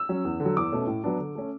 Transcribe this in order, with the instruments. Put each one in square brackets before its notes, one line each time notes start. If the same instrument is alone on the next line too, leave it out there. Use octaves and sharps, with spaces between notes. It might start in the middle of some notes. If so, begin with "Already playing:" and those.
Already playing: [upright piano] E6
F#3 C#4
E2
D3
F#3
E2 D6
B2 A3 C#4
A2
F#3 B3 D4
D3
A3 C#4